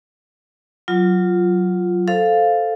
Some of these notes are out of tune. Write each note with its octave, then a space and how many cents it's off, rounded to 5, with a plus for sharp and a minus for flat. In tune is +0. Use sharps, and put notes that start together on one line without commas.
F#3 +0 F4 +0
A4 +0 C5 +0 F5 +0